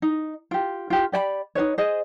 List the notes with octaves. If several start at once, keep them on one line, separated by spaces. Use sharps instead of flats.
D#4
F4 G4
F4 G4
G4 D5 G5 B5
D#4 G4 B4 C#5
G#4 C5 D#5